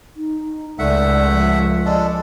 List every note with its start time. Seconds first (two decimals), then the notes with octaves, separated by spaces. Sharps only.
0.16 D#4
0.79 C#2 A3 D5 E5 F#5
1.31 F3
1.86 G#3 D4 A4